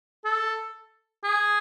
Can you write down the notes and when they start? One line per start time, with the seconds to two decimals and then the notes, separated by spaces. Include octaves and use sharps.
0.25 A4
1.24 G#4